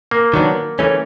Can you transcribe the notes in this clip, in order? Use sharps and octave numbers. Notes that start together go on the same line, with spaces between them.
A#3
D#3 F#3 B3 D4
E3 A3 C#4